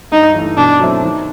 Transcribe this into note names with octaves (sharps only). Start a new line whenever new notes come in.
G2 D#4
E3 A3
B2 D4
F#3 A3 C4 E4
D#3